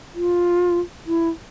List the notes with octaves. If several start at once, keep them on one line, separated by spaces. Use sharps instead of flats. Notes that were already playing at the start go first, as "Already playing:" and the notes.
F4
E4